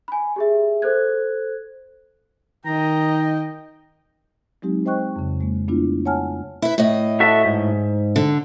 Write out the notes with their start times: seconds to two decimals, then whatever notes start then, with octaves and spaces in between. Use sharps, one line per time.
0.08 G#5 B5
0.36 G4 G#4 E5
0.82 A4 C5 F#6 G#6
2.66 D#3 D#5 G5 A#5
4.62 F#3 G#3 C4 D#4 G4
4.86 C5 D#5 G5 C#6 F#6
5.16 F2 C#3
5.41 G#3 A#3
5.68 A3 B3 D4 E4 F4
6.05 C#5 F#5 G#5 A5 F6
6.62 E4 B4
6.78 A2 D#5
7.20 F#4 A4 E5
7.45 G#2
8.16 D3